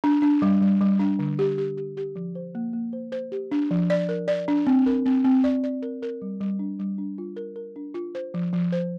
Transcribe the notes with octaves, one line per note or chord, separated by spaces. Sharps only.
D4
D4
G3
G3
G3
D4
D3
G4
G4
G4
G4
F3
C5
A#3
A#3
C5
C5
G4
D4
F3
D5
A#4
D5
D4
C4
A#4
C4
C4
D5
D5
A#4
A#4
G3
G3
D4
G3
D4
F4
A#4
A#4
D4
F4
C5
F3
F3
C5